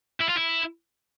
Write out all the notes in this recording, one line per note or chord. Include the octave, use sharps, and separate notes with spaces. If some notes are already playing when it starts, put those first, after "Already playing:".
E4
F4
E4